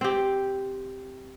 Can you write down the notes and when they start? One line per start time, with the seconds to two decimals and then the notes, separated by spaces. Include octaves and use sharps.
0.01 C4 G4